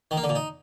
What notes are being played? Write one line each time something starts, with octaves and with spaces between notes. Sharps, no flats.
D#3
A#3
D3
A#2
D#4